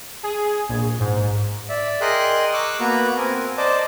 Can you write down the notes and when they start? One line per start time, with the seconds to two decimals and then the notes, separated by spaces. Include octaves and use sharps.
0.23 G#4
0.69 A#1
1.00 G#2
1.69 D5 E5
2.01 G#4 A#4 D#5 G5 C6 F#6
2.53 C#6 D6 E6 F#6
2.80 A#3 B3 F#4 B4 A#5
3.17 C4 A#4 G#5
3.57 C5 D5 D#5 A5 D6